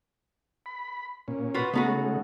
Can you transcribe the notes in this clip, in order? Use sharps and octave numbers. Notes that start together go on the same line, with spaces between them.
B5
A#2 C#4
F4 F#4 B4
C#3 G#3 A3 B3 D#4 F#4